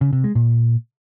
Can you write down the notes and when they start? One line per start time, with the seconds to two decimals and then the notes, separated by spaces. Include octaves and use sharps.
0.01 C#3
0.13 C3
0.24 G#3
0.35 A#2